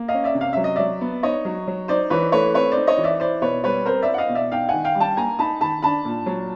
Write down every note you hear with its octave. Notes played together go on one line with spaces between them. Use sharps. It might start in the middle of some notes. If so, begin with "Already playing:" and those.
Already playing: A#3
D#5 F5
C#4
D5 E5
C3
F5
F#3 E5
D#5
F#3 D5 E5
B3
D#4 C#5 D#5
F#3
F#3
D#4 C5 D5
E3 B4 C#5
A3 B4 C#5
C4 B4 C#5
C5 D5
D#4
C#5 D#5
E3
D5 E5
E4 C5 D5
B2 B4 C#5
G3 B4 C#5
C4 A#4 C5
D5 E5
E4
F#5
D#5 F5
B2
D5 E5
D#4 F5 G5
D#3 F#5 G#5
F5 G5
G3
G5 A5
A#3 G#5 A#5
D#4 A5 B5
D#3 A5 B5
D4 A5 B5
A#2
F#3